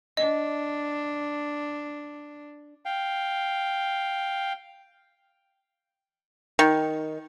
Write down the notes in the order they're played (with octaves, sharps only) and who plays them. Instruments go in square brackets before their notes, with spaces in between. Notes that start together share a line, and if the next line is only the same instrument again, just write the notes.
[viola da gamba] D4 [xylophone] D#5
[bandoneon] F5 G5
[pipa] D#3